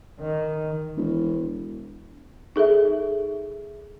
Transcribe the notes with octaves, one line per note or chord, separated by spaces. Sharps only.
D#3
E1
D#4 G#4 A4 E5